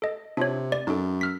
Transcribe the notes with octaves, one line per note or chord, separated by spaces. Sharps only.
A4 D#5
C3 D4 F4 C#5
D5
F#2 D#4 A4
E6 F6 B6